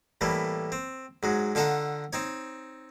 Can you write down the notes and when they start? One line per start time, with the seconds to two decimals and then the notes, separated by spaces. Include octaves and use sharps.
0.21 A2 E3 G3 A3 A#3
0.72 C4
1.23 G#2 F#3 G#3
1.55 D3 F4 A4 D#5 F#5 A#5
2.13 C4 D#4 C#5